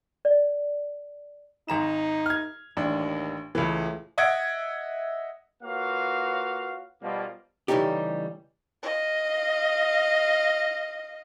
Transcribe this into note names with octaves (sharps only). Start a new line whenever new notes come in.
D5
G#1 D#4 A#5 E7
F6 G#6
A1 D#2 D4
C#2 A2 E3
D#5 E5 F#5 G#6 D7
A#3 F4 F#4 B4 C#5 F5
B2 F3 G3 A#3
C#3 E3 G3 A3 D#4 G4
D#5 F5